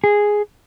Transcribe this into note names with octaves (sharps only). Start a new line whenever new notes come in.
G#4